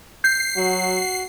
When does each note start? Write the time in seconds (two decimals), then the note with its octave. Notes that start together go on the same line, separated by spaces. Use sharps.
0.24 G6 C7
0.57 F#3 F#4